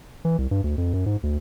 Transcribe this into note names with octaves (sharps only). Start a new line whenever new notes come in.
E3
C2
G2
D2
F2
F#2
G#2
D2